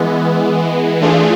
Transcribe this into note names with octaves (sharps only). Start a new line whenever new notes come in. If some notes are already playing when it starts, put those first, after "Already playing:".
Already playing: E3 G#3 B3
E3 A3 D4 F4 G#4